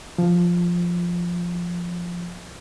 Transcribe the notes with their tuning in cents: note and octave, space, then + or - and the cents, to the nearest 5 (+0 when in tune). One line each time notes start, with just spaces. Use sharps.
F3 +0